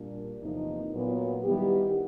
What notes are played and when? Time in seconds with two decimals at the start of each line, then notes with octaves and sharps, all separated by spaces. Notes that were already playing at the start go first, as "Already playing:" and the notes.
Already playing: A#2 G3 A#3 D4
0.41 E2 C3 F3 A#3 D#4
0.93 A#2 F#3 B3
1.44 D#3 G3 B3 E4 G4